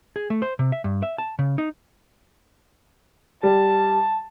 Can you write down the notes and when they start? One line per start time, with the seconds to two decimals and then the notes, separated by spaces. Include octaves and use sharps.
0.16 G#4
0.30 A3
0.42 C5
0.59 C3
0.72 E5
0.84 G2
1.03 E5
1.18 A5
1.39 C#3
1.58 D#4
3.43 G3 A5